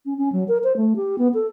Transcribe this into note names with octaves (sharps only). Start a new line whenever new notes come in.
C#4
C#4
F#3
A#4
C5
A3
G4
B3
A4